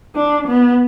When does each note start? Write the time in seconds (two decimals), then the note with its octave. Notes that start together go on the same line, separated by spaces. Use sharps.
0.15 D4
0.48 B3